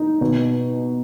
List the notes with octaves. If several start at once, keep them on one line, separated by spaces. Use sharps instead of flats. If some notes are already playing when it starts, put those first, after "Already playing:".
Already playing: D#4
B2